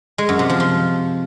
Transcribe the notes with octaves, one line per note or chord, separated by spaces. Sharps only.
G#3
F#2
C3
F3
F3